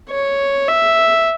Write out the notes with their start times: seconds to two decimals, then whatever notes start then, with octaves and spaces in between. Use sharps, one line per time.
0.10 C#5
0.68 E5